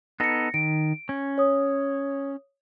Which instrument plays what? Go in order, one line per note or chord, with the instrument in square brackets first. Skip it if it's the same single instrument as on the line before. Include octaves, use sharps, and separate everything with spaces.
[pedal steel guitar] B3 D#4 A4 [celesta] A#6 C#7
[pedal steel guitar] D#3 [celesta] D7
[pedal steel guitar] C#4
[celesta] C#5 D#6